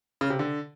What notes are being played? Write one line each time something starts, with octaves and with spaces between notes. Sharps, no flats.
C#3
C3
D3